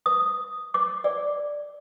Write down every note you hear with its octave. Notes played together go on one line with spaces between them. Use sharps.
D#6
D6
D5